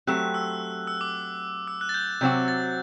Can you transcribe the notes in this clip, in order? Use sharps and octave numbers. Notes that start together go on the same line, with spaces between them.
F#3 A3 C4 G4 F#6
E6
E6
D6
E6
F#6
A6
G6
C3 F#3 C4 F#4 G6
A6